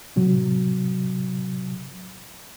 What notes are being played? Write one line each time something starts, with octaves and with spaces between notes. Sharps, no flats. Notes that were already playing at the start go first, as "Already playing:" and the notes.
A2 C3 F#3